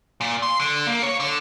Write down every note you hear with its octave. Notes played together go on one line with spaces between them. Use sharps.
A#2
C6
D3
A#3
C#5
D3